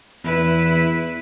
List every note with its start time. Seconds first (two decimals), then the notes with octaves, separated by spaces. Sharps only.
0.24 E2 E4 B4